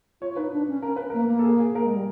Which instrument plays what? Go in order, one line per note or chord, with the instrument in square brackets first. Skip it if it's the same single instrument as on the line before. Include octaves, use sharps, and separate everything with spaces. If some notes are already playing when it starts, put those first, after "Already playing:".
[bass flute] F4 [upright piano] C#5
[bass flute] D#4 [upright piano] B4
[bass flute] D4
C#4
[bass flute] C#4 [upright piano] A#4
[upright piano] B4
[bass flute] A#3 [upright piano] A#4
[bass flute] A#3
[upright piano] A4
G#4
G#4
[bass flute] A#3 [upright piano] A#4
[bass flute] G#3
G3